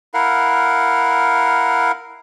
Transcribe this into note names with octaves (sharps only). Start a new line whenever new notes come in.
E4 A#4 F5 F#5